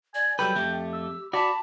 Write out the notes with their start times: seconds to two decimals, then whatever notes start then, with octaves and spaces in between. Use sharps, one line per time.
0.15 D5 G#5
0.39 F#3 G3 A4 B4 G5
0.55 F2 A3 G4
0.93 E6
1.33 F#4 D5 A5 B5